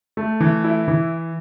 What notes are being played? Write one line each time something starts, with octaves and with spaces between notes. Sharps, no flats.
A3
E3
E4
E3